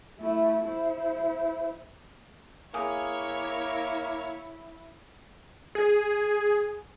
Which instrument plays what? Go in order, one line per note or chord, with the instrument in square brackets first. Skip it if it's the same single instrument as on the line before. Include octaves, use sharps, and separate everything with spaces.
[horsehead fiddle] A3 E4
E4 C5
[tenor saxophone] A#3 [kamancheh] E4 [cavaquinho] G#4 [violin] C#5
[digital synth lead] G#4